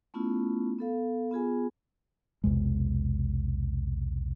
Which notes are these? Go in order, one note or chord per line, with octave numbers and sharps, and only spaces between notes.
A3 B3 C#4 E4 F4
B3 A4 F5
B3 F4 G#4 G#5
B1 E2 C3 G#3